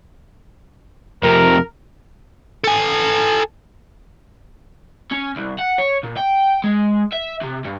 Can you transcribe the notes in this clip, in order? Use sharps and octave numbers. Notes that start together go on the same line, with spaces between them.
F2 C3 A#4
A4 G#5
C#4
C2
F#5
C#5
A#2
G5
G#3
E5
C3
G2